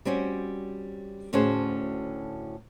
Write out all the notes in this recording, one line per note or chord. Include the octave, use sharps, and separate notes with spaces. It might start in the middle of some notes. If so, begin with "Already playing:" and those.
G3 C4 C#4 F#4
D2 A2 C#4 F#4 G#4 C5